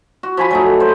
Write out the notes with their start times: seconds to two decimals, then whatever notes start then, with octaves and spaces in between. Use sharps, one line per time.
0.23 F#4
0.37 F3 G#5 B5
0.51 F#3 A3 D#4
0.80 C5